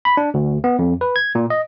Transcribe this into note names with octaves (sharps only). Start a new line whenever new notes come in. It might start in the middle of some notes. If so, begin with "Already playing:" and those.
B5
D4
D2
B3
F2
B4
G#6
A#2
D#5